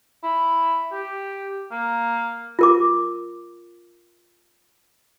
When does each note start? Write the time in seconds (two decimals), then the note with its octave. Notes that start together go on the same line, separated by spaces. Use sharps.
0.23 E4
0.92 G4
1.71 A#3
2.59 F4 A#4 D6